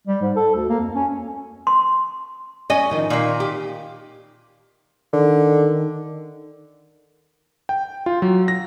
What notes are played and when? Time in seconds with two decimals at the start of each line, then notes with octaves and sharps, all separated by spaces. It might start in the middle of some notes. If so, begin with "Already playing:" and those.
0.07 G3
0.22 G#2
0.36 A4
0.55 D2
0.69 A#3
0.81 F2
0.95 C#4
1.67 C6
2.70 C#4 D5 D#5 G#5
2.90 A2 D#3 F3
3.10 A#2 D#3 A#3
3.40 G4
5.13 D3 D#3
7.69 G5
8.06 F4
8.22 F#3
8.48 A#6